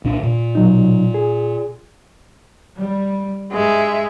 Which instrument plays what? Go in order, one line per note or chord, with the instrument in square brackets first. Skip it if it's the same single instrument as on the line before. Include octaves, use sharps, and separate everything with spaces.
[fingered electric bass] C2 A#2 D4
A#2
[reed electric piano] B2 F#3 D#4
G#4
[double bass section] G3
[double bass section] G2 [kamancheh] G#3 E5